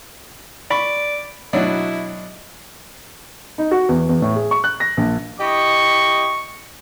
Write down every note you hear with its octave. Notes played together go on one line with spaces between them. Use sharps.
D5 B5 C#6
B2 F#3 D4 E4
D#4
F#4
E2
E2
A2
G#4
C#6
F#6
A#6
A#1
E4 G4 D#5 C#6